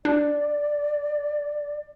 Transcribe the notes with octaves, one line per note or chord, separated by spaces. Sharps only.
D4 D5